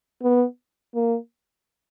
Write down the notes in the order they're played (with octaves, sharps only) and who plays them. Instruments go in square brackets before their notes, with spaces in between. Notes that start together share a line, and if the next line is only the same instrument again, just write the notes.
[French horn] B3
A#3